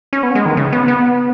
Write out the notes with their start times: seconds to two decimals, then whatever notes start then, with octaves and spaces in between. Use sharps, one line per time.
0.13 C#4
0.23 B3
0.35 G#3
0.46 D#3
0.57 C#3
0.73 B3
0.88 B3